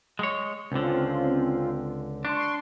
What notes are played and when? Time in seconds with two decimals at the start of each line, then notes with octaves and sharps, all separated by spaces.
0.19 G#3 C#5
0.72 C#2 D3 C4 C#4 F4
2.25 D4 C6 C#6